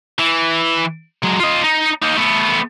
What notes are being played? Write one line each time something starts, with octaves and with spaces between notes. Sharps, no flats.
E3
F#3 G#3
F4 D#5
D#4
A#3 D#4
A3 B3